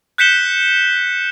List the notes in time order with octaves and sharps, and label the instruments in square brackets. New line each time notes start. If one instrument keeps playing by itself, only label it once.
[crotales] F#6 G6 B6 C#7 E7 G7